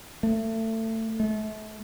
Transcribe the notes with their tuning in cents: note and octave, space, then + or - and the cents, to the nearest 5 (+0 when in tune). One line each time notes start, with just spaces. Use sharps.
A3 +25
A3 -35